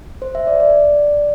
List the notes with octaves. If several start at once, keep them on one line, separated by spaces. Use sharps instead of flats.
C5
E5
D5
D5